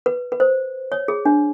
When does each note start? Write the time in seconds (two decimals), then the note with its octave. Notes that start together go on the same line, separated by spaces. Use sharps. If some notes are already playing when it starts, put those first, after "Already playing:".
0.06 B4
0.32 B4
0.40 C5
0.92 C#5
1.08 G#4
1.25 D4